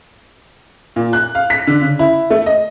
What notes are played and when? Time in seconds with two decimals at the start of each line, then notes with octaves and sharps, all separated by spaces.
0.96 A#2
1.13 F#6
1.35 F5
1.50 B6
1.67 D3
1.81 C#3
1.99 E4
2.30 A3
2.46 D#5